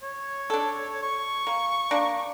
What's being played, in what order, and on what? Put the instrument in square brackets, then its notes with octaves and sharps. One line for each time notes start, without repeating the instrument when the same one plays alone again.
[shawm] C#5
[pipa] D4 A4
[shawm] C#6
[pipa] A#3
A#3 D4